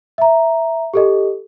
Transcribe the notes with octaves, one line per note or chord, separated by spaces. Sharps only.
E5 A#5
G4 A4 D#5